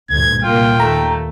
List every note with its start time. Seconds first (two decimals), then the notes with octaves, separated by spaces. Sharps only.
0.10 D2 G2 A#2 G#6
0.43 C2 A#2 A#3 F4 G5
0.80 D#2 A3 A#5